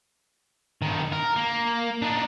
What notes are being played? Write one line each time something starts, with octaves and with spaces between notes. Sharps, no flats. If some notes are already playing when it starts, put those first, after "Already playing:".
G2 D#3
A#4
A#3
D4 D#4